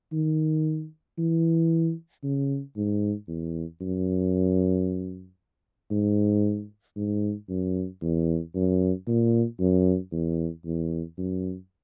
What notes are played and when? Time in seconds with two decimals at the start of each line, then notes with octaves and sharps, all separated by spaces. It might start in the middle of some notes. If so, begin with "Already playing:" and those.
0.13 D#3
1.18 E3
2.23 C#3
2.76 G#2
3.28 E2
3.81 F#2
5.91 G#2
6.96 G#2
7.49 F#2
8.02 E2
8.55 F#2
9.07 A#2
9.60 F#2
10.12 E2
10.65 E2
11.18 F#2